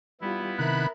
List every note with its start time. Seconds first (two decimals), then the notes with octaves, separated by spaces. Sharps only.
0.21 G3 B3 E4 F4
0.59 C3 D#3 A#4 E5 B5 F#6